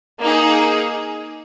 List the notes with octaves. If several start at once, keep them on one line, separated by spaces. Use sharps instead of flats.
A#3 D#4 G#4